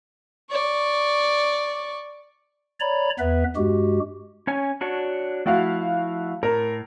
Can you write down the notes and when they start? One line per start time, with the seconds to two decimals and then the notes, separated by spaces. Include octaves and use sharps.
0.51 D5 C#6
2.80 C#5 D5 A#5 B5
3.19 E2 B3 B4 E5
3.56 G2 G#3 F#4 G4
4.47 C#4 C#5 G#5
4.81 D4 F#4 C#5
5.46 F3 A3 E4 F#4 F5
6.43 A2 A#4